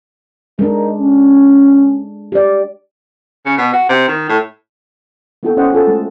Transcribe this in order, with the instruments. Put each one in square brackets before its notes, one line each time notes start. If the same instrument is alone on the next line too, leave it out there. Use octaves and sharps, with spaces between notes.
[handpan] G#3 D4 [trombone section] D#4 A#4
[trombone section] C#4
[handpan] G4 D5
[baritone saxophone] C#3
B2
F#4
C3
D#3
A2
[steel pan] A#3 B3 E4 F#4 A4 G5
C#4 C5 C#5 D#5 F#5 G5
F4 G#4 A4 A5
G#3 A3 F#4 A5